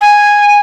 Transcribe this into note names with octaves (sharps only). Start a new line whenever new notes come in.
G#5